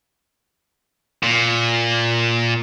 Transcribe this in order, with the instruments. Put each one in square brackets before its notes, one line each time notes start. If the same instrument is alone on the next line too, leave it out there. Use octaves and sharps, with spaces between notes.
[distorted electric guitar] A#2